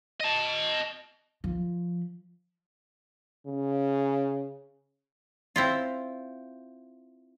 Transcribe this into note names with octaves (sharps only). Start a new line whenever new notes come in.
D#5 A5
F3
C#3
C4 E4 F4